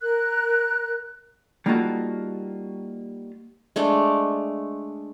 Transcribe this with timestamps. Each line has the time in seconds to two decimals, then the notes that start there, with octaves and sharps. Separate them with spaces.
0.01 A#4 F#6
1.66 G3 A#3 D#4 F4 F#4 A4
3.76 G#3 A3 D4 D5